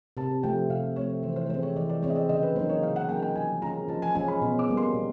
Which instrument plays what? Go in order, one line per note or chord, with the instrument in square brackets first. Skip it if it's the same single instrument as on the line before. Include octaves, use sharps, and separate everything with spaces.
[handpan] C3 [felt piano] A5
[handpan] F3 A3 C4 [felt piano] G5
[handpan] C3 [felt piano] F5
[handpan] F3 A3 C4 [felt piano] C#5
[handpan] E3 [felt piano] C5
[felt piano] C5
[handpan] G#3 C4 [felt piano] C5
[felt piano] C#5
[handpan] E3 [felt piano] D5
[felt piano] D5
[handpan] G#3 C4 [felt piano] C#5
[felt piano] D#5
D5
[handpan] C#3 [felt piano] D#5
[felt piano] B4
[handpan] F#3 A#3 D#4 [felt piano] C5
[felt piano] C#5
[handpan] C#3 [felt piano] F5
[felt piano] F#5
[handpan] F#3 A#3 D#4 [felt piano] G5
[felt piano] G5
[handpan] F3 [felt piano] G#5
[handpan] G#3 C#4 F4 [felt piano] A#5
[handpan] F3 [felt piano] A5
[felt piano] G#5
[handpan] G#3 C#4 F4 [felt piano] G#5
[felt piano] B5
[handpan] B2
[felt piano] D6
[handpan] G3 A#3
[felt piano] C6
[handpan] B2